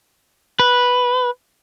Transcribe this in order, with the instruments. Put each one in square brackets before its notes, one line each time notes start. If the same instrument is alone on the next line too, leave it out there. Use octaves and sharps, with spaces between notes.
[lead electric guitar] B4